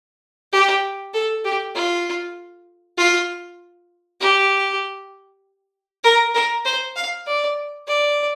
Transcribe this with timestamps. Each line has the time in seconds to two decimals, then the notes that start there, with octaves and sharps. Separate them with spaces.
0.52 G4
1.14 A4
1.44 G4
1.75 F4
2.98 F4
4.20 G4
6.04 A#4
6.34 A#4
6.65 C5
6.96 F5
7.27 D5
7.87 D5